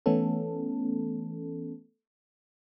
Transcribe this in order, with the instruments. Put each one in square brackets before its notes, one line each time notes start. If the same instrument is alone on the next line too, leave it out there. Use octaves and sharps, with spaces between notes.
[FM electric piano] E3 A3 B3 C#4 A4